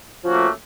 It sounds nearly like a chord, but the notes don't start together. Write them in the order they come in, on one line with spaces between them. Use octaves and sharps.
F3 C#4 F#4 A#3 A3